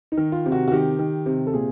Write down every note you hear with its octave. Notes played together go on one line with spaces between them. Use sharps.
D#4
D#3
F4
C3
F#4
F#4
D#3 G4
D#3
C3
A4
A#2 G#4